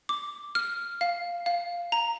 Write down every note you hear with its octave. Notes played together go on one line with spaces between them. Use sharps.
D6
F6
F5
F5
A#5